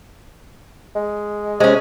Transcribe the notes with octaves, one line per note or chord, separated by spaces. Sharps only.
G#3
C3 G#3 C#4